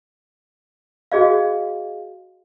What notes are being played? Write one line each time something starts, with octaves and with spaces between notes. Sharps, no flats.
F#4 G#4 D#5 F5